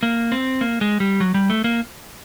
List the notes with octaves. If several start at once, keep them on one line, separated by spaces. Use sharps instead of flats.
A#3
C4
A#3
G#3
G3
F#3
G3
A3
A#3